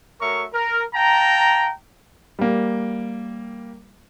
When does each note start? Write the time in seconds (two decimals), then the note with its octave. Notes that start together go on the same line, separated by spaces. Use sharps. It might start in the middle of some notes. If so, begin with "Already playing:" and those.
0.21 A3 F#4 A#4 C#5 E5 C#6
0.53 A#4
0.94 F5 G5 A5 A#5
2.39 G3 A#3